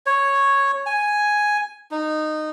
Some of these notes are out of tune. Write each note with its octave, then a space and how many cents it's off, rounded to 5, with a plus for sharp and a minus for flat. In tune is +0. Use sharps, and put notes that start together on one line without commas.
C#5 -5
G#5 +0
D#4 -15